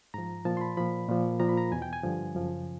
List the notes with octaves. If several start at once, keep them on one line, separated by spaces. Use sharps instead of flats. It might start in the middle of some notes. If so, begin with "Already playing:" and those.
G#2 F3 A#5
A#2 F3 A5
C6
B5
A#2 F3 B5
A#2 F3
A#2 F3 A#5
B5
A#5
E2 B2 G#5
G5
G#5
G2 D3 F3
F#2 C#3 F3